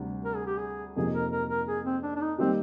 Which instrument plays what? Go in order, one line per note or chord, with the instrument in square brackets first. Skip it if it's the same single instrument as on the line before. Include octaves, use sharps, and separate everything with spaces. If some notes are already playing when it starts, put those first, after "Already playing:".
Already playing: [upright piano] D2 C3 G3
[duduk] A#4
G#4
G4
G#4
[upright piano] F2 C3 F3 A#3 D#4 [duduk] G#4
[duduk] A#4
A#4
A#4
G#4
C4
D4
D4
D#4
[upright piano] D#3 G3 A#3 D#4 G4 [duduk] C4